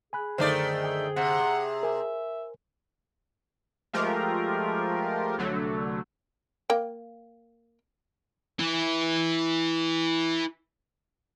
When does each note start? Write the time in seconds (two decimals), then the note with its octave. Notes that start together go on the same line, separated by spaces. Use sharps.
0.13 G#4 G#5 B5 F#6
0.38 F#2 D3 D#3 A3 C5 D5 G5
0.84 G5
1.16 C3 F#5
1.83 A#4 E5 G#5
3.93 F3 G#3 A3 F4 G4 A#4
5.38 C2 D3 F#3 A3
6.70 A#3 G5
8.59 E4 B4